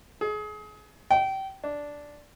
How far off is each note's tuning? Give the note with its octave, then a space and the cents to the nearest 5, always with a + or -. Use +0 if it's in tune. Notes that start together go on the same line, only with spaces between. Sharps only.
G#4 +30
G5 -25
D4 -5